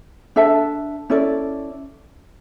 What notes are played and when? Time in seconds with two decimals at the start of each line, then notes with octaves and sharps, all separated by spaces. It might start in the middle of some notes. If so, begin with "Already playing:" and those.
0.36 D4 A4 E5 A5
1.10 C#4 E4 A4 D5